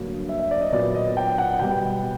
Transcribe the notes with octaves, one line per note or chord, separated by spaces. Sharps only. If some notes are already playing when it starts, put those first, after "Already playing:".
Already playing: G2 D3 F#3 A#3
E5
E5
D5
D#5
A#2 F#3 B3 D5
D#5
G5
F#5
B2 G3 B3 G5